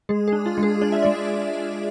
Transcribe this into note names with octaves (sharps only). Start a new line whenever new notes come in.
G#3 G#4
D4 G#4
F4
G#3
G#4
D4 D5
E5
G#3 D5